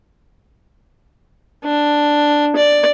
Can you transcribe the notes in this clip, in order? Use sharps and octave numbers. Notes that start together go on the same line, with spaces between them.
D4
D5